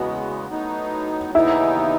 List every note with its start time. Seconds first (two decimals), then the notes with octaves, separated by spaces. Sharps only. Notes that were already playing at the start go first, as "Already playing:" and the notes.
Already playing: E2 C#3 G#3 B3 F#4
0.48 A2 F#3 B3 D#4
1.34 D#2 C#3 E3 B3 D#4 E4